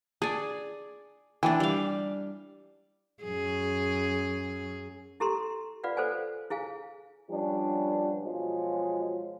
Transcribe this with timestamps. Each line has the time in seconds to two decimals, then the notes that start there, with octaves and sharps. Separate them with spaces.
0.22 D4 G#4 D5
1.43 E3 A#3 D4 G5 G#5
1.60 G3 F5
3.24 F#2 G#4
5.20 E4 G4 A4 A#5 C6
5.84 F4 B4 D5 F5 F#5
5.97 A4 B4 C5 D5 F#5 G#5
6.50 E4 G#4 F5 G#5
7.31 F3 G3 B3 C#4 D4
8.22 B2 F3 F#3 G#3